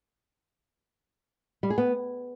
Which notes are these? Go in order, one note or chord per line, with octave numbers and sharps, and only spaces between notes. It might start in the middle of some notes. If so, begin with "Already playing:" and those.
G3
G#4
B3